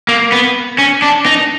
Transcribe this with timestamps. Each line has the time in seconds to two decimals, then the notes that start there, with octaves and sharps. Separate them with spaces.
0.09 A#3
0.32 B3
0.78 C#4
1.02 D4
1.26 D#4